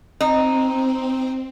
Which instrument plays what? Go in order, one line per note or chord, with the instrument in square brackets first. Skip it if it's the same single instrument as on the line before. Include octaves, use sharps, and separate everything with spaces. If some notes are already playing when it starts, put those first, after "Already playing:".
[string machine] C4 [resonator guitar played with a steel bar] D#4